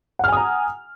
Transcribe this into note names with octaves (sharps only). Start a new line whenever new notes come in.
F#5 G#5 A#5 D#6 F6